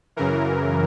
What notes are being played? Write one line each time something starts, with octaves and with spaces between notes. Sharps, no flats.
F#2 C#3 E3 A#4